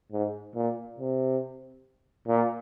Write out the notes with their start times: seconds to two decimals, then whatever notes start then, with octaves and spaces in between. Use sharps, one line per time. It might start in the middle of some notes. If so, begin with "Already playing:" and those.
0.12 G#2
0.55 A#2
0.98 C3
2.28 A#2